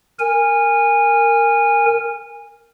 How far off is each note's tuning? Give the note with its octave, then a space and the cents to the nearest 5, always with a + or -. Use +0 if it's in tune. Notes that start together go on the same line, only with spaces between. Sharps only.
A#4 -10 G#5 -20